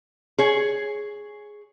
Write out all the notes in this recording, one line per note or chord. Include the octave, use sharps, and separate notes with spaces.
G#4 C#5